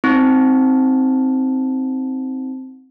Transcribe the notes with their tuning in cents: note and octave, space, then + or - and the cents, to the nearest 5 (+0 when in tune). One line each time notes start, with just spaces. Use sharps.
C4 +0 D#4 +25